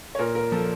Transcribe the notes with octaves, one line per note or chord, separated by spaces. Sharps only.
C#5
A#2 A#4
A#4
F3 A4